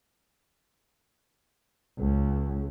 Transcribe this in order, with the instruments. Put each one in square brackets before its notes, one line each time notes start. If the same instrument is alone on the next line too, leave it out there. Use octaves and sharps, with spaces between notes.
[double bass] C#2